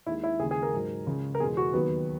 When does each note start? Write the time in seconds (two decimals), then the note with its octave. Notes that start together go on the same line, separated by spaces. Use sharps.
0.06 D#2 D#3 G#3 E4
0.23 E4
0.39 D#2 C#3 G#3 G#4
0.51 G#4
0.63 A#4
0.74 G#2 F#3
1.07 C#2 C#3 G#3
1.35 A#4
1.40 E2 B2 G#3 G#4
1.57 F#4
1.73 D#2 D#3 F#3 B3